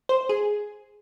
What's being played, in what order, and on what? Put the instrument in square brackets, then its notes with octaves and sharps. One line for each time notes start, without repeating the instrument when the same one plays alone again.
[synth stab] C5
G#4